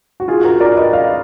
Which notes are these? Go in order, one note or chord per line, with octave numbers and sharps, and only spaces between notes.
F#4
F4 G#4
F#4 A#4
A#4 D5
B4 D#5
D5 F5